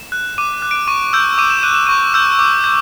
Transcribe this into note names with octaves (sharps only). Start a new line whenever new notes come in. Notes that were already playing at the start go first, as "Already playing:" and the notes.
Already playing: E7
F#6
D6 D#7
F#6
D7
C#6 D#7
E6 G6
D6 D#7
E7
F#6 D#7
E7
C#6 D#7
E6 G6
D6
G6